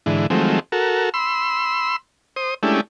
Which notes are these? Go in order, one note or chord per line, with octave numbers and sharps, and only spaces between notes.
G#2 D3 E3
D#3 F3 F#3 G#3 A3 C4
F#4 A4 A#4
B5 C6 E6
C5 D#6
G#3 A3 C#4 D4 E4 G4